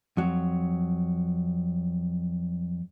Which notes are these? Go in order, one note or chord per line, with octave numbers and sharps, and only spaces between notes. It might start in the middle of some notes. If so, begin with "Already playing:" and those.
F2 F#3